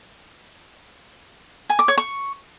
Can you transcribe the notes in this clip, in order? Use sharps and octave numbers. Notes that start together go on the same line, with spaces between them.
G#5
D6
C#5
C#6